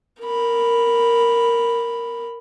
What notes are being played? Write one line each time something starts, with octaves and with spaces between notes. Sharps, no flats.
A#4 B5